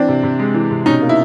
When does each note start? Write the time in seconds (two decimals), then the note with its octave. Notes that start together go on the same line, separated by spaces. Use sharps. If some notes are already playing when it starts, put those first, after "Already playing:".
Already playing: E3 C4 D4
0.08 C3
0.23 C3
0.39 G#3
0.54 E3
0.70 C3
0.86 B2 C#4 D#4
1.02 A#3
1.09 E4